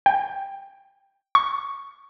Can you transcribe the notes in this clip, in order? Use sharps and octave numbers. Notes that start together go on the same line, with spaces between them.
G5
C#6